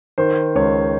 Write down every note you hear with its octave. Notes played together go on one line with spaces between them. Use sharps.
D#3 C5
C#2 C#5